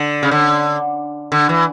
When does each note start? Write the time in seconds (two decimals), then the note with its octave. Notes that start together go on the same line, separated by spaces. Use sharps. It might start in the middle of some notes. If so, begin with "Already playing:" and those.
Already playing: D3
0.23 C#3
0.31 D3
1.32 D3
1.49 E3